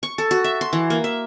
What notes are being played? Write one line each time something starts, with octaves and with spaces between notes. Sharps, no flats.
C#6
A4
F#4
E5
C6
E3
A#3
E5